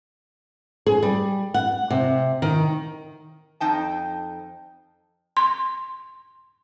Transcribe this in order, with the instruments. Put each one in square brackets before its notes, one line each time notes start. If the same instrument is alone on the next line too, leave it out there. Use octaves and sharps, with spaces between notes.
[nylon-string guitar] G#4
G3
F#5
C3
D#3
[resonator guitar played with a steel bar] F2 D#4 G5 A5
[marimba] C6